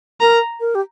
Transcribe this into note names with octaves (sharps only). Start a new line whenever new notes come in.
A#4 A#5
A#4
G4